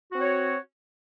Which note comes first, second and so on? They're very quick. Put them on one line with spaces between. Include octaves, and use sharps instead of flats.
F#4 C4 C#5